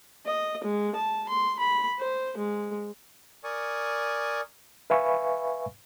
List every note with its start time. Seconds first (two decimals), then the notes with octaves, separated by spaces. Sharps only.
0.26 D#5
0.64 G#3
0.95 A5
1.29 C6
1.59 B5
1.99 C5
2.37 G#3
3.44 A#4 D5 G#5 C#6 D#6
4.90 B4 E5 F5 G#5 B5 C#6